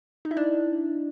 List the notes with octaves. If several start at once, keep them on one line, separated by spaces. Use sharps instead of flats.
D#4
E4
D4